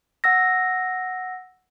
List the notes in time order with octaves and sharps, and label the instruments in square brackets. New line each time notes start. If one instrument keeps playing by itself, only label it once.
[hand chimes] F#5 E6 A#6